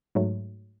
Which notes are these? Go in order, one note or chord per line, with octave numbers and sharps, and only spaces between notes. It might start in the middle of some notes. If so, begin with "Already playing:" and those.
G#2 F#3 A3